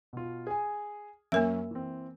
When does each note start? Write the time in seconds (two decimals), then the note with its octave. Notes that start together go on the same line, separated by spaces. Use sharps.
0.13 B2 F4
0.47 G#4 G#5
1.32 F#2 A#3 C#4 A#4 E5 E6
1.71 E3 C4